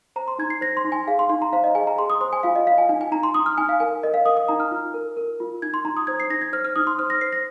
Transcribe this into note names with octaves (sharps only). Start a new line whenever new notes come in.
C5 A#5
C6
D#4 G#6
C7
C5 A#6
C6
D#4
G#5
G#4 F5
C6
D#4 C6
A#5
C5 F5
D#5
G#4 G#5
A#5
G#4 C6
D#6
C5 C6
G#5
F4 F5
D#5
F4 F5
G#5
D#4 G#5
G#5
D#4 A#5
C6
D#4 D#6
F6
D#4 G#5
F5
A#4 G#5
A#4 D#5
F5
A#4 D#6
D#6
D#4 A#5
F6
F4
A#4
A#4
F4
D#4 G#6
C6
D#4 A#5
D#6
C5 G#6
C7
D#4 A#6
G#6
C5 F6
F6
D#4 D#6
C6
C5 F6
A#6
C5 C7
A#6